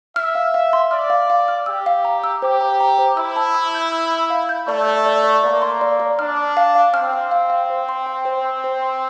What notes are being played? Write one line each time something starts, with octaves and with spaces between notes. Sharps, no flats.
E5 F6
F5
F5
C6
D5 F6
F5
F5
F6
G4 E6
F5
A#5
E6
G4 C5
A#5
A#5
C5
E4 E6
A5
E6
G6
E6
E6
F5
G6
A3 D5
D5
D5
D5
A#3 D5
C6
D5
D5
D4 F6
D6
F5
F5
C4 F6
F5
F5
F5
C5
C6
G5
C5
C6
C5
C6